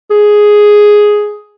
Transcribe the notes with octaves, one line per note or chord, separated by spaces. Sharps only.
G#4